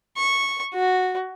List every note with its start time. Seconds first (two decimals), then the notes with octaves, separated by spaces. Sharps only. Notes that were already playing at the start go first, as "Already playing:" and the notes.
0.17 C#6
0.74 F#4